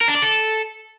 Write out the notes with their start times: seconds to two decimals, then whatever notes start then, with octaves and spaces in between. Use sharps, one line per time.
0.01 A#4
0.08 D4
0.15 D5
0.22 A4